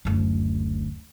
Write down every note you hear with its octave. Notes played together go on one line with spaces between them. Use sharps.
F#1 D2